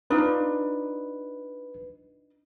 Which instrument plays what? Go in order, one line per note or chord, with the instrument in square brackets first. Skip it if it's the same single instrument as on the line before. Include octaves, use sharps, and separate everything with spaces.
[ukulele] D4 D#4 F4 [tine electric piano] B4